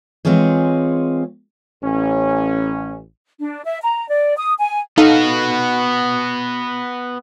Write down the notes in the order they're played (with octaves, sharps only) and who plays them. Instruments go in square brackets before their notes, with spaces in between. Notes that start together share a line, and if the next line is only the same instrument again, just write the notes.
[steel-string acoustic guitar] E3 G#3 C4 F4 G#4 C#5
[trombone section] A1 C#4
[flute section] D4
E5
A#5
D5
D#6
G#5
[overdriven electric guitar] B3 F#4 [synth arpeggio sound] D#4 A4 F5